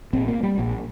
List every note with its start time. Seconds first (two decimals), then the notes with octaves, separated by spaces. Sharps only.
0.13 A#1 A#2 C4
0.28 A#3
0.43 G3
0.58 A#1 A#2